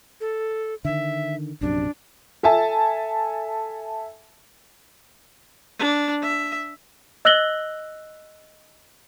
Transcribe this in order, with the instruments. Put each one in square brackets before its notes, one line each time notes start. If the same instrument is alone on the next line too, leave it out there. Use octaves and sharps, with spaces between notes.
[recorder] A4
[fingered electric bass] D3 D#3 [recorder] E5
[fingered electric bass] A#1 F#2 C3 [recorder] D4
[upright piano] A4 E5 G#5 A5
[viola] D4
E5
[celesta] D#5 E6 F#6 A#6 F#7 G7